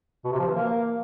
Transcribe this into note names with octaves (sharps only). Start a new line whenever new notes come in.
B2
C3
F3
E3
A#3